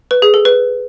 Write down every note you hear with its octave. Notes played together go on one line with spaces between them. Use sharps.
B4
G#4
A4
B4